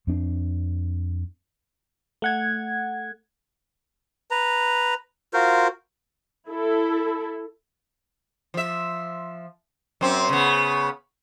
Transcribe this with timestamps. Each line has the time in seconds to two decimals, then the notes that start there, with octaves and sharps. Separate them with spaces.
0.07 F2 C4 D4
2.22 A3 F#5 G#6
4.31 B4 A#5
5.34 F4 F#4 A#4 C5
6.48 E4 A4
8.54 F3 E5
10.01 F#2 C4
10.29 C#3 B3